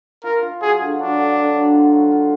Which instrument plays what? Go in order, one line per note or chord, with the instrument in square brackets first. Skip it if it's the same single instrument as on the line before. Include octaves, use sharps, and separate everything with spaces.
[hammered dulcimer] F4 [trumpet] A#4
[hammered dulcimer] F4
[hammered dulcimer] F#3 [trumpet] G#4
[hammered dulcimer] D3
[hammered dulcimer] F#3 [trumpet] D4
[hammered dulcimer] D3
D3
F#3
F4
F#3
F4